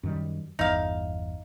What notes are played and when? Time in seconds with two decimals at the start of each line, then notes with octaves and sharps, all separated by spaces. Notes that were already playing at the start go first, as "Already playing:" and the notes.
0.03 F#2 D#3 G3
0.59 G1 E2 E3 D#4 F5